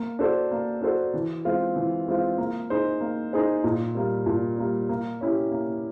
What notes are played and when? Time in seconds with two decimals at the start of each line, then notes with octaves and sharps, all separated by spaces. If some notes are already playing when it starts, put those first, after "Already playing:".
Already playing: A#3
0.19 D4 F#4 A4 C5
0.51 A#3
0.82 D4 F#4 A4 C5
1.14 E3
1.45 G#3 C4 F4
1.76 E3
2.08 G#3 C4 F4
2.38 A#3
2.70 D#4 G#4 C5
3.01 A#3
3.33 D#4 G#4 C5
3.64 A#2
3.95 G3 A#3
4.26 A#2
4.58 G3 A#3
4.89 A#3
5.21 C#4 E4 G4
5.52 A#3